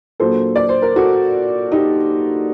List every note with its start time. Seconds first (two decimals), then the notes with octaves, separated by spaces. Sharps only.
0.20 A#2 F#3 A#3 D4 A4 C5
0.56 D5
0.69 C5
0.82 A#4
0.96 F#4 A4
1.72 D#4 G4